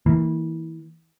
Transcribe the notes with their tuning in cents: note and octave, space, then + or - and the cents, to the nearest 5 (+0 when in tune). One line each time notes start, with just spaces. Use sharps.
E3 -25 A#3 -15